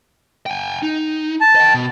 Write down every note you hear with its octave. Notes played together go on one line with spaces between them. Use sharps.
G5 G#5
D#4
A5
D#5 G5
B2